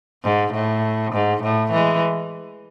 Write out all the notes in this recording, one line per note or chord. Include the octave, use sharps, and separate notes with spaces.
G#2
A2
G#2
A2
E3 G#3